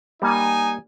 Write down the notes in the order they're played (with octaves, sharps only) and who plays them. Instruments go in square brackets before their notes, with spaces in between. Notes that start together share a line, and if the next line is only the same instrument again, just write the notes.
[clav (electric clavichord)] G3 A#3 [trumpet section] D#4 G#5